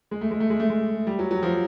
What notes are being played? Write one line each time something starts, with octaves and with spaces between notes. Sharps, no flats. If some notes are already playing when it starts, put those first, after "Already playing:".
G#3
A3
G#3
A3
G#3
A3
G#3
G3
F#3
F#3
F3